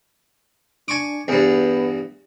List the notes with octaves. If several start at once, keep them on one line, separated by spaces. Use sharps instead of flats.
D4 G#5 C#6 D6
E2 G2 B3